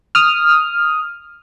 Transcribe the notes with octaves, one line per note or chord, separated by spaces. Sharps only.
D#6 F6